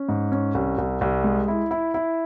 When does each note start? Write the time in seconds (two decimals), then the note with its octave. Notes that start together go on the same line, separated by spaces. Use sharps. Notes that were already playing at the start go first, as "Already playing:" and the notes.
Already playing: C#4
0.09 G#2
0.32 C#4
0.55 C2
0.78 C2
1.01 C2
1.24 G#3
1.48 E4
1.71 E4
1.94 E4